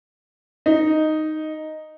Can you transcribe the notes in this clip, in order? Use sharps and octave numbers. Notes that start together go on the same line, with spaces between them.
D#4